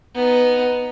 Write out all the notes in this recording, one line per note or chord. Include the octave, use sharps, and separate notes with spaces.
B3 D#4